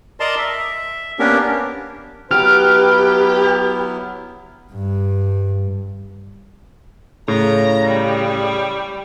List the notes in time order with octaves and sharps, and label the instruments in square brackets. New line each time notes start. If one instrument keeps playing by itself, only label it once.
[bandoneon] A#4 D5 D#5 A5 A#5 C6
E5
A#3 B3 C#4 D4 G4 A#4
[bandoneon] F#3 B3 E4 [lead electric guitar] G4 [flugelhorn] B4 [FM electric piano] F6
[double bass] G2
[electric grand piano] A2 [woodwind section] C#3 [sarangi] A#5
[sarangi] G3